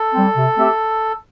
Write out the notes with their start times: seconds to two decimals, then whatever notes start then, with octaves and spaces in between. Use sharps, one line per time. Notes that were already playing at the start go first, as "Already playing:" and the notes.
Already playing: A4
0.14 G3 C4
0.36 C3
0.57 A3 C4 G4 E5